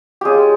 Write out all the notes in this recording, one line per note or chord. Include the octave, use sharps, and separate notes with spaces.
G#3 C#4 F4 G4 G#4